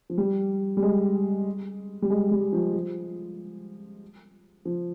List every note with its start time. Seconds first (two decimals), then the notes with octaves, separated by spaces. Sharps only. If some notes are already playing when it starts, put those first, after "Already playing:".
0.10 F3
0.18 G3
0.77 G3
0.82 G#3
2.02 G3
2.10 G#3
2.31 G3
2.53 F3
2.74 F3
4.65 F3